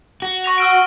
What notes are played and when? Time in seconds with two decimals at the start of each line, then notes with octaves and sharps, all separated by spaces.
0.22 F#4
0.44 C#6 A#6 F7
0.58 F#5 E6 F6 D7